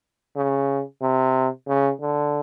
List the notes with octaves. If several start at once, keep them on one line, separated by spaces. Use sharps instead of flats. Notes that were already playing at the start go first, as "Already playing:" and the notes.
C#3
C3
C#3
D3